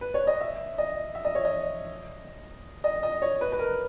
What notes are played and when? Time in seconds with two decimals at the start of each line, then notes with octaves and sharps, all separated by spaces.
0.01 B4
0.14 C#5
0.27 D#5
0.41 E5
0.78 D#5
1.15 E5
1.25 D#5
1.35 C#5
1.45 D#5
2.84 D#5
3.03 D#5
3.22 C#5
3.41 B4
3.52 B4
3.59 A#4